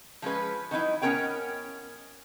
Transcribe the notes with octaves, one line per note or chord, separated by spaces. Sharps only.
F3 G#3 C#4 B4
D#3 F#3 D#4 E4
B3 C#4 D#4 A#4 C#5 G5